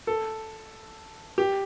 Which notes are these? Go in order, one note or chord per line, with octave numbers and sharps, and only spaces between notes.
A4
G4